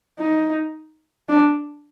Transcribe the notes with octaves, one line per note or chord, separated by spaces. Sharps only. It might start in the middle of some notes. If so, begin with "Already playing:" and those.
D#4
D4